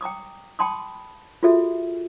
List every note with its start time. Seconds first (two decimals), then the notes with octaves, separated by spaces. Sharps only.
0.01 G5 A#5 D6 D#6
0.59 G5 A5 B5 C6 D6 D#6
1.43 F4 F#4 G#4 A4 E5